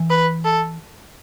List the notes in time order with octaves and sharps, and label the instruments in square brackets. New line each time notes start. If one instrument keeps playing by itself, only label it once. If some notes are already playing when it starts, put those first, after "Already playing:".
Already playing: [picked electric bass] E3
[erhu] B4
A4